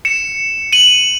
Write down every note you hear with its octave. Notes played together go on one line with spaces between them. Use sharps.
C#7 E7
D#7 F#7